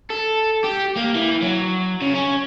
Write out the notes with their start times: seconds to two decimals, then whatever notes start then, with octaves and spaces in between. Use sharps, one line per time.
0.10 A4
0.64 G4
0.97 A#3
1.15 E3
1.43 F#3
2.02 C#3
2.15 C#4